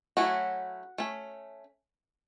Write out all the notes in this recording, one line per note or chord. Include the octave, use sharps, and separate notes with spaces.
F#3 A3 C#4 E4 F#4
A3 C#4